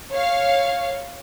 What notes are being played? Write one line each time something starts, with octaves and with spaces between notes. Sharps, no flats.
C#5 F5